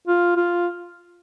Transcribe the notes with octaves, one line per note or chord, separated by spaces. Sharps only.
F4
F4